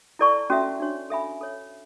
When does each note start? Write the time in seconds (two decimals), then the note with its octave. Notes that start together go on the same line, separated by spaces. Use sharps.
0.19 E4 A4 D5 A5 C#6
0.50 C#4 F#4 A4 E5 A5
0.80 D4 F#4 C#5
1.10 A4 E5 G#5 B5
1.41 A4 C#5 E5